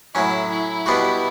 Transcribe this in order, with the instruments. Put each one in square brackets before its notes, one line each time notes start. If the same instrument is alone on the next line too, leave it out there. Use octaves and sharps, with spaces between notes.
[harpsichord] A2 F#3 C#4 [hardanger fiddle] E4
[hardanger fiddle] E4
[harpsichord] B2 G3 B3 D4 F#4